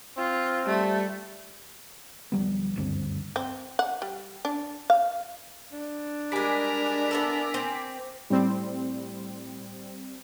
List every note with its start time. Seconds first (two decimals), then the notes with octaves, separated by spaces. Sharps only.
0.17 C4 F4
0.66 G3 A3
2.32 D1 F3 G3 B3
2.76 F#1 D2 G2 C4
3.36 C4
3.79 F#5
4.02 G3
4.45 D4
4.90 F5
5.72 D4
6.32 G3 G#3 A#4 G#5 D6 B6
7.11 B3 E4 A4
7.54 C4
8.30 A2 G3 C4